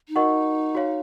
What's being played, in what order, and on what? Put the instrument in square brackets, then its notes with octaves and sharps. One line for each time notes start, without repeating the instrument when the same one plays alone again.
[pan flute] D#4
[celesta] F#4 A#4 D#5 F#5 C#6
F#4 C#5 F5